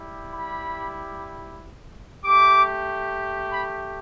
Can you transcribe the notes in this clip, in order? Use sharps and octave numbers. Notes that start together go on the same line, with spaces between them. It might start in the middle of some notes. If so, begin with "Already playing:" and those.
Already playing: G3 E4 G4
B5
A3 G4 D6
B5